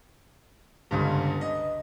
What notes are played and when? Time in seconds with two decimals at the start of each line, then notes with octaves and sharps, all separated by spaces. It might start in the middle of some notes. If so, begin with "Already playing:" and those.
0.91 G1 C#2 G2
1.41 D#5